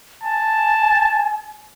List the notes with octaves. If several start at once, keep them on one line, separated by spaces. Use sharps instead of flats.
G#5 A5